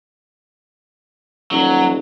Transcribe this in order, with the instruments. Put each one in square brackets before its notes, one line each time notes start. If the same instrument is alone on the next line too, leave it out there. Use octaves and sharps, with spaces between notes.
[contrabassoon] D#1 [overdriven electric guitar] F#3